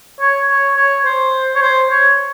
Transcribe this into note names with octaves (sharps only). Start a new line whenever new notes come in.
C#5
C#5
C#5
C5
C#5
C5
C#5